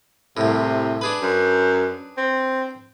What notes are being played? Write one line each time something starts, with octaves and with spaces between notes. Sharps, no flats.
C2 A2 C3
D4 G#4 B4
F#2
C4